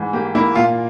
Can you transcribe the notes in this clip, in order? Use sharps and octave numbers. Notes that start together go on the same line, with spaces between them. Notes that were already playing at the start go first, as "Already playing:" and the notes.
Already playing: G#2 E3
A#3 G4
A#3 E4
A#2 F4